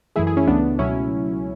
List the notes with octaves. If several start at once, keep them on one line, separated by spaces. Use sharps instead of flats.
F#2 E3 A3 E4 G#4
E4 G#4
C#4 E4
C#2 C#3 E3 A3 B3 D4
C#2 B2 F#3 A3 C#4 E4